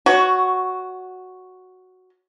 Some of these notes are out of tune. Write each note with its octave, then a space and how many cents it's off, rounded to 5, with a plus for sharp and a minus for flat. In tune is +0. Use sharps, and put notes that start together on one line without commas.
F#4 +0 C#5 +20